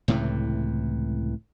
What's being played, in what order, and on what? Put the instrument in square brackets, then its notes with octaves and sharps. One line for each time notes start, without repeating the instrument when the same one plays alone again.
[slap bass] C#2 A2 C3 E3